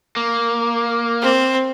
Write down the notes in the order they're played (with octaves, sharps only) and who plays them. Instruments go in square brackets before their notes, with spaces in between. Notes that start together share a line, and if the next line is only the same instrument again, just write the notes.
[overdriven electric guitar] A#3
[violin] C4